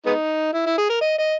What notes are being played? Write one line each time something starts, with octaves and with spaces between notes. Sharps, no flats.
G#3 B3 D#4
E4
E4
G#4
A#4
D#5
D#5